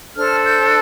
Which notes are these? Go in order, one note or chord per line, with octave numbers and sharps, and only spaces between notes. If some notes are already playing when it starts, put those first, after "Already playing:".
D4 A4 C5 F6
G6